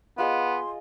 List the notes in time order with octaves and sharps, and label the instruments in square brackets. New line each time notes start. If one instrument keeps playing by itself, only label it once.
[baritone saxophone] B3 [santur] F4 G#4 D#5 [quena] C6